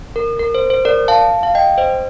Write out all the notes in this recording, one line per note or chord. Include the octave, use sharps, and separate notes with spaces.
A#4
A#4
C5
C5
A#4 D5
F5 A5
F5
D#5 G5
C5 D#5